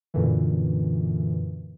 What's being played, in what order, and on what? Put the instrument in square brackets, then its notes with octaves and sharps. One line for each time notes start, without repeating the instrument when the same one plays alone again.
[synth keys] F#2 A#2 D3 E3